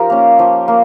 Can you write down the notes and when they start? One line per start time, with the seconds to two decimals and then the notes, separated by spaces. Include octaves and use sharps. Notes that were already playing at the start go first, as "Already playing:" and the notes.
Already playing: F3 D#4 F4 G4 A#4
0.10 A#3 C#4
0.39 F3
0.68 A#3